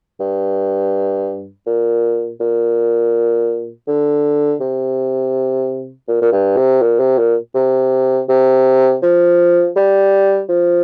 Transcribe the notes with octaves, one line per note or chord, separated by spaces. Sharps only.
G2
A#2
A#2
D3
C3
A#2
A#2
G2
C3
A#2
C3
A#2
C3
C3
F3
G3
F3